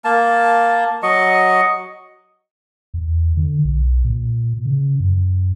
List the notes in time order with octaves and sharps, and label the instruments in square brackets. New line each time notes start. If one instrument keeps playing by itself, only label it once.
[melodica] A#3 A5
F#3 D#5 C#6
[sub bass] E2
D3
B1
A#2
C#3
F#2